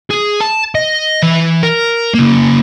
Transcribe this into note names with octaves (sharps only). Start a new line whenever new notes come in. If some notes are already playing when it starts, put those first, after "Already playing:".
G#4
A5
D#5
E3 B5
A#4
C#3 A#3